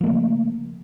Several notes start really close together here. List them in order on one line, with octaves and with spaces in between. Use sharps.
F3 A#3 A3 C#3